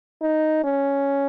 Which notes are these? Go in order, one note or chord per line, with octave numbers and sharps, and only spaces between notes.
D#4
C#4